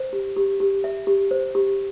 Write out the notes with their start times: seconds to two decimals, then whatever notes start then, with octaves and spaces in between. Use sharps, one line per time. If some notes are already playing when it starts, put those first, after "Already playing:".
Already playing: C5
0.13 G4
0.36 G4
0.60 G4
0.84 E5
1.07 G4
1.31 C5
1.55 G4